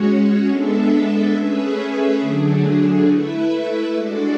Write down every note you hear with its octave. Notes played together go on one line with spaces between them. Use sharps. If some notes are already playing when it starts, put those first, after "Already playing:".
Already playing: G#3 C#4 F#4 C#5
G#3 B3 D4 A4 E5
A3 C#4 G#4 B4 E5
D3 F#3 A3 D4 G#4
A3 E4 B4 E5
G#3 D4 F#4 A4 D5